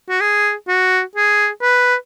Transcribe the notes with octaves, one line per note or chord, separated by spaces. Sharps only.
F#4
G#4
F#4
G#4
B4